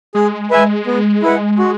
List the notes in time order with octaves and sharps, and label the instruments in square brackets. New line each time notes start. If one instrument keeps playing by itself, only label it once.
[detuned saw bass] G#3 [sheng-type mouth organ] G#4
[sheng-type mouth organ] B4 E5 G#5
B3
E4 B4 F#5
F#4